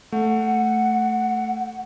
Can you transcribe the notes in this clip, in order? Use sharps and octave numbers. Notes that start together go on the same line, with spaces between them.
A3 F#5